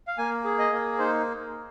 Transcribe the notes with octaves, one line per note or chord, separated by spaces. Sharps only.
F5
A#3 G#5
G#4
D#5
A#3
D#4 C5